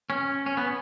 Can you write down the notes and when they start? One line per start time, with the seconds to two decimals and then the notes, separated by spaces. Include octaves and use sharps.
0.10 C#4
0.46 C#4
0.57 B3